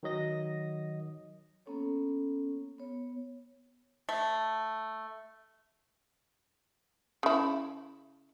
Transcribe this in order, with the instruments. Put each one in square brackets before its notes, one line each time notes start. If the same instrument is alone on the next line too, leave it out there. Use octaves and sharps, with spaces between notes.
[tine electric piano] D#3 F#3 D#5 A#6
[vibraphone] A#3 B3 C#4 A4 C#5
B3 C#5
[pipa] A3
[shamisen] C#3 E4